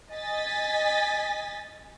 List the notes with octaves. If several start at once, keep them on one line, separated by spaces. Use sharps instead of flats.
D#5 G#5 A6 B6